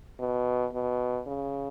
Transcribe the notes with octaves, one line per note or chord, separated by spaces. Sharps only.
B2
B2
C#3